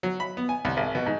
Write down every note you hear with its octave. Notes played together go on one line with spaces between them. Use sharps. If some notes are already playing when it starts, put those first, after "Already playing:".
F#3
B5
B3
G#5
C2
G#1
B2
G#2